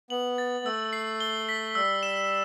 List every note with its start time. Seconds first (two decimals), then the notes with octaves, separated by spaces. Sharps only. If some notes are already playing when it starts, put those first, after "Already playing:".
0.10 B3 F#7
0.38 A6
0.65 A3 E6
0.93 C7
1.20 G7
1.49 B6
1.75 G3 E6
2.03 E7